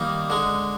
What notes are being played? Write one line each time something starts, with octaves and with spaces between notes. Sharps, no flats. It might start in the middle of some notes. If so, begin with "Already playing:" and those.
Already playing: D#3 G3 A#3 D#4
D3 G#3